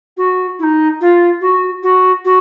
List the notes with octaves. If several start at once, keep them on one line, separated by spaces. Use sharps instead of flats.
F#4
E4
D#4
F4
F#4
F#4
F#4